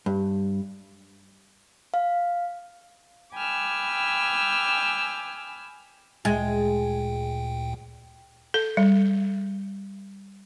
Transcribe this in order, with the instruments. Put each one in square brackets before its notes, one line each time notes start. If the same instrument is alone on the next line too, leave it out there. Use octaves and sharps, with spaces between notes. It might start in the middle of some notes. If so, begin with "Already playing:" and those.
[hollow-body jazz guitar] G2
[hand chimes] F5
[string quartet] G5 G#5 B5 D6 E6 F6
[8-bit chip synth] D2 A#2 G5 [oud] G#3
[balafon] A4
G3